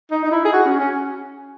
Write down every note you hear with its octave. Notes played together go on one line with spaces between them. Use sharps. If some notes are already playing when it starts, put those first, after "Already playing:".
D#4
D#4
E4
G#4
F#4
C#4
C#4